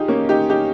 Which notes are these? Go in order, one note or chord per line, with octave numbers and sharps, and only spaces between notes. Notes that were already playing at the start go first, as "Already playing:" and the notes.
Already playing: D#4 F4 G4 G#4
A#3 C#4
D#4 G4
D#4 G4